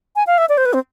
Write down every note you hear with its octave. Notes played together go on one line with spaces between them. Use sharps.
G#5
F5
E5
D5
C5
B4
C4